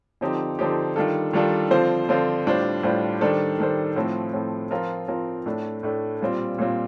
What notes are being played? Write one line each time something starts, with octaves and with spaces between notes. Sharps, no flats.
D3 F3 C4 D#4 G4
D3 F3 C4 D#4 G4
D#3 G3 D4 F4 A4
D#3 G3 D4 F4 A4
D3 F3 C4 F4 C5
D3 F3 C4 F4 C5
A2 G3 D4 F4 C5
A2 G3 D4 F4 C5
D#3 G3 D4 A4 C5
D#3 G3 D4 A4 C5
A2 F3 A3 C4
A2 F3 A3 C4
F3 C4 F4 A#4
F3 C4 F4 A#4
A2 A3 D4
A2 A3 D4
A#2 G3 C4 F4
A#2 G3 C4 F4